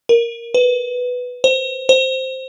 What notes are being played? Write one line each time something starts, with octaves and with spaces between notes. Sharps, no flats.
A#4
B4
C5
C5